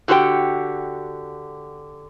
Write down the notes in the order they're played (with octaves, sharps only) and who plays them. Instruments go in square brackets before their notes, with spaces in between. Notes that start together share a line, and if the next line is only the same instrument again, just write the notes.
[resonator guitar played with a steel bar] D3 F#4 G4 C5 G5